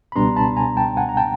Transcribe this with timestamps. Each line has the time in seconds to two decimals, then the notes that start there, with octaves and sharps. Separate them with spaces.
0.12 B5
0.16 C#2 B2 G3 B3 D4 A#5 C6
0.36 A5 B5
0.56 G#5 A#5
0.77 G5 A5
0.97 F#5 G#5
1.09 A#5
1.17 G5 A5